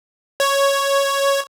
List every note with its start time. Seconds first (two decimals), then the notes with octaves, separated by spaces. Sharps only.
0.40 C#5